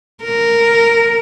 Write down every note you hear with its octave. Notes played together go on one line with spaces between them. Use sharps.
A#4